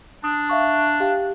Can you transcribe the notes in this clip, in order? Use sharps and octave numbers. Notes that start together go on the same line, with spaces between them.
D4 D#6
E5 F5 C#6
G4 F5 G5